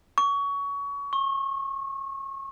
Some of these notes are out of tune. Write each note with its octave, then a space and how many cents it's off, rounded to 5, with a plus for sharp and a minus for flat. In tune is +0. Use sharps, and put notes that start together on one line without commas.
C#6 +25
C#6 -30